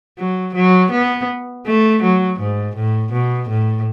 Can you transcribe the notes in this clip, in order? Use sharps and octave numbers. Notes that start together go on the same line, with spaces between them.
F#3
F#3
B3
A3
F#3
G#2
A2
B2
A2